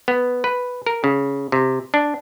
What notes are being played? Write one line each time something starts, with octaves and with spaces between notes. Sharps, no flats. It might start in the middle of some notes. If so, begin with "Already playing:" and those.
B3
B4
A#4
C#3
C3
D4